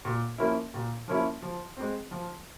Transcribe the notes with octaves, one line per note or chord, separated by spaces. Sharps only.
A#2
F3 A#3 C#4 E4
A#2
F3 A#3 C#4 E4
F3
G#3 C4
F3